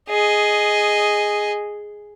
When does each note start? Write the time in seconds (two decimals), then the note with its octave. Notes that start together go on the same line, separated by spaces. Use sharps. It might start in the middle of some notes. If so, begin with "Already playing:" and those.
0.10 G#4 D#5